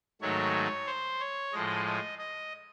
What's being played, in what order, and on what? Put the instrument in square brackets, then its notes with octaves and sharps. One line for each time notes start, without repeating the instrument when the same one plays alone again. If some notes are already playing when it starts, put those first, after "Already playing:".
[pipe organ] G#2 D#3 F#3 A3 C#5
C5
C#5
A2 F3 G#3 D#5
D#5
D#5